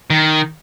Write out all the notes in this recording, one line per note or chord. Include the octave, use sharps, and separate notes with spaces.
D#3